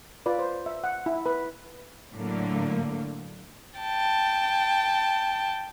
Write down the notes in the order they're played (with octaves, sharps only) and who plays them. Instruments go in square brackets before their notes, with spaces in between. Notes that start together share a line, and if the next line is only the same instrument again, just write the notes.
[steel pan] F4 B4 D5
C5
E5
F#5
E4
B4
[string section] A2 D3 F#3 A#3
[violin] G5 A5